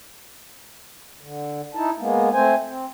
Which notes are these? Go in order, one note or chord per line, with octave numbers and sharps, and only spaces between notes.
D3
D#4 E4 A5
G#3 A#3 B3
A3 C4 C5 G#5
C4